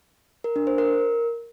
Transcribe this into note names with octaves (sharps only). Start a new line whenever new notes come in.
A#4
D4
C5
A#4